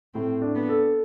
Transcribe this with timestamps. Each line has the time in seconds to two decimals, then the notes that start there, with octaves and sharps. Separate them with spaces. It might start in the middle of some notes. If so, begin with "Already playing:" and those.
0.14 A2 C4
0.42 D4
0.55 B3
0.69 A4